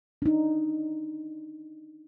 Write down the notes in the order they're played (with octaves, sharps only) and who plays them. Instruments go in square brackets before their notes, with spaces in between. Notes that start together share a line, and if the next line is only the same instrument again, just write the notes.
[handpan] D4 D#4